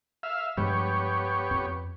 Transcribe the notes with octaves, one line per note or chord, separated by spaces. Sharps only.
E5 F5
G2 F3 G#3 B3 G4 C#5
F2